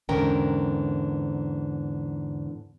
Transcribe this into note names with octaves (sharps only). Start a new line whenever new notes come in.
E2 G#2 D3 C#4 A#4 G5